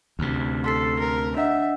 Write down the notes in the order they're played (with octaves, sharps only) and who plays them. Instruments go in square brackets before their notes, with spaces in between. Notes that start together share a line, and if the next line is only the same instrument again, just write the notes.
[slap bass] D2 C3
[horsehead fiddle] A4 [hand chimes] C6 B6 C7
[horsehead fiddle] A#4
[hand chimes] D4 D#5 F#5 [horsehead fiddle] E5